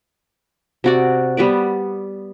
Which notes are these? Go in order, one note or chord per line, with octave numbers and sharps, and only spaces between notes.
C3 F#4 D5
G3 B3 B4 D5